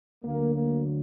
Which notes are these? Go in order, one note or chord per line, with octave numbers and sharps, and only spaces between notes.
D2 D3 F#3 A#3
A#3